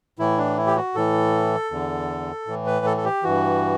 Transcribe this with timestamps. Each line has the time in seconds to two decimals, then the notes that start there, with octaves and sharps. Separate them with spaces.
0.19 A2 E3 E4
0.38 D4
0.57 E4
0.67 G4
0.76 F#4
0.95 A2 E3 A4
1.71 E2 D3
2.47 A2 E3
2.66 B4
2.86 A4
2.97 A4
3.04 G4
3.23 G2 E3 F#4